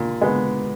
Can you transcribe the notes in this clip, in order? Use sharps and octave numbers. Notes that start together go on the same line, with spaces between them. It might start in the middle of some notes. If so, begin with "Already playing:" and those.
Already playing: A#2
G#3 B3